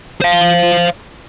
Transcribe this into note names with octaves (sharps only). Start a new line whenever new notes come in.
C5 F5